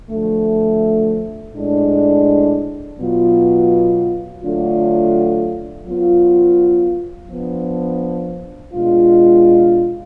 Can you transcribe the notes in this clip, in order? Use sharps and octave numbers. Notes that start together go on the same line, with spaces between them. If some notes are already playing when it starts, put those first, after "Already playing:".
D3 F3 A3
A2 G#3 D4
B2 F#3 B3 F4
D3 F#3 A3 D4 F4
F#3 B3 F4
F3 B3 D4
B2 G#3 D4 F4